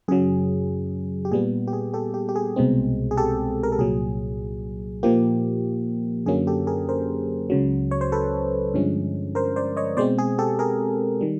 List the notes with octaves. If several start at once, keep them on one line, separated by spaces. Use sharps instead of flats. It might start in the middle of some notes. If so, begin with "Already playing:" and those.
F#2 C#3 F#3 G#4
G4
A#2 G3 B3 G#4
G4
G#4
G4 A4
G4
G4
G#4
C2 B2 G#3 C4
G#4
G4 A4
A#4
A4
C2 A#2 F#3 G#4
A#2 F3 A#3 G4
F#2 D3 F#3 A#3 C#4 G#4
G4 A4
G#4 A#4
A#4 C5
C#2 C#3 F#3
C#5
C5
A4 B4
G2 D3 F3 G#3 C#4
A#4 C5
C5 D5
C#5 D#5
B2 G#3 C4 C5 D5
G#4
G4 A4
G#4 A#4
D#3 G3